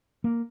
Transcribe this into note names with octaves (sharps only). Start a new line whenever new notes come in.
A#3